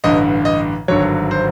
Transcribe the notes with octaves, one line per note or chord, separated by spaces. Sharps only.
A1 G2 D3 D#5
D#5
G#1 G2 D3 F#3 C#5
C5